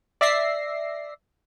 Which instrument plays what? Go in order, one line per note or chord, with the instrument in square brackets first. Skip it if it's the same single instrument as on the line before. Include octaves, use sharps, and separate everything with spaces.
[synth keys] D5 E5 A#6 C7